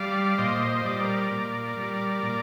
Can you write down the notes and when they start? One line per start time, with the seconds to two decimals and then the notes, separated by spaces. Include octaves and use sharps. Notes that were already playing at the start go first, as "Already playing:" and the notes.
Already playing: G3 D5 F5
0.38 A#2 C5 D#5
0.84 G3 D5
0.93 C5
1.00 A#4 D5
1.31 A#2
1.77 G3
2.23 A#2